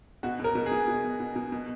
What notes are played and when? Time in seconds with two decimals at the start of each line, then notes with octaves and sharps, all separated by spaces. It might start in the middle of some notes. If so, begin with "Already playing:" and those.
0.23 B2 F#4
0.40 B2 A#4
0.55 B2
0.66 G#4
0.72 B2
0.88 B2
1.04 B2
1.20 B2
1.36 B2
1.52 B2